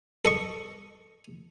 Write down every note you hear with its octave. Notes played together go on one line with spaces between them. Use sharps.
A4 D#5 C#6